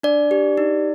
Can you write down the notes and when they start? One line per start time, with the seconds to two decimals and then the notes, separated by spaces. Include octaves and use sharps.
0.03 D4 D5
0.31 G4
0.58 D#4